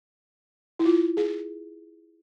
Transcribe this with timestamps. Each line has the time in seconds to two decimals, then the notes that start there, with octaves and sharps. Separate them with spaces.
0.79 E4
0.85 F4
1.17 G#4